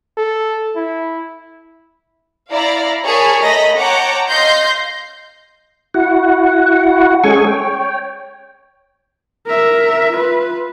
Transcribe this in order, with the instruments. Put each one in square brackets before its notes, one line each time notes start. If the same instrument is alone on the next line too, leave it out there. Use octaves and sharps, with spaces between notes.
[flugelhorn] A4
E4
[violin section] E4 D5 F5 A#5
G#4 A#4 C#5 G#5 A5 B5
A3 D#5 A#5 B5 A#6
C#5 F#5 G5 A5 A#5 D6
D#5 F5 C6 G6 A#6 C7
[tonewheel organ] E4 F#4 F#5
G#3 C#4 G#4 A4 G#5 C#6
C#5 G5
[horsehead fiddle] A#4 E5
F4 B4